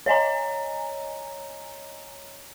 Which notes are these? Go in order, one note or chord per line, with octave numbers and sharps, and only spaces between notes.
C#5 D#5 G#5 A#5